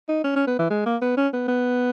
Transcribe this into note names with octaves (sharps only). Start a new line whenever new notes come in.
D#4
C#4
C#4
B3
E3
G#3
A#3
B3
C#4
B3
B3